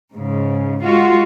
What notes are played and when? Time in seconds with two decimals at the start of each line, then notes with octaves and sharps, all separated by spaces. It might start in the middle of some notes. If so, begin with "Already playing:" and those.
0.14 G#2 C#3
0.84 G#3 F4 F#4